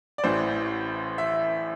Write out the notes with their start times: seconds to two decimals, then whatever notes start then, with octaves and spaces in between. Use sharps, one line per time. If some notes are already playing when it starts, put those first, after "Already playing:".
0.18 D5
0.24 A1 A2 E3 C5
1.18 E5